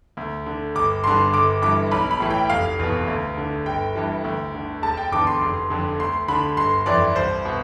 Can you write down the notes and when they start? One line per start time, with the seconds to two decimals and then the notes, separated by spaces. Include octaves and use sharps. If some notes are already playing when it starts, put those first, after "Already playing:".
0.17 D2
0.46 D3
0.75 G1 D6
1.04 G2 D3 C6
1.34 G1 D6
1.62 G2 E3 D6
1.91 B1 B5
2.11 B5
2.20 A2 E3
2.30 G5
2.50 F1 F5
2.79 E2 B2
3.07 D2
3.38 D3
3.66 G1 G5
3.96 G2 E3
4.24 D2
4.54 D3
4.82 E1 A5
4.97 G5
5.12 E2 D3 D6
5.27 C6
5.41 F1
5.70 F2 D3
5.99 D2 C6
6.28 D3 B5
6.57 G1 C6
6.86 F2 E3 D5
7.15 C2 C5
7.45 B2